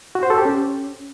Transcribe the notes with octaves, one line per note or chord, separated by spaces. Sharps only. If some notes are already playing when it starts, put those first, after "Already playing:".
F#4
C5
A4
G4
C#4